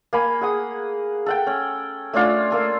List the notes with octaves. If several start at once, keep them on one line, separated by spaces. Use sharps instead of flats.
A#3 G#5 B5
G#4 F#5 D#6
A4 F#5 G5
C#4
A3 C#4 D4 F4
A#3 A4 G#5